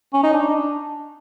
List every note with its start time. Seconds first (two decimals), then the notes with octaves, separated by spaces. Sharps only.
0.14 C#4
0.23 D#4
0.33 D4